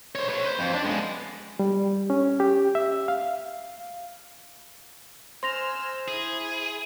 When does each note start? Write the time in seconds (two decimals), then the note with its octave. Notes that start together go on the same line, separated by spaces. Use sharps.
0.15 C5 C#5
0.29 B4 C#5
0.45 C5
0.59 F2
0.73 D4
0.85 G#3 B3
1.59 G3
2.10 C#4
2.40 G4
2.75 E5
3.08 F5
5.43 C5 G#5 C6 E6 F6 A#6 F7
6.08 E4 G#4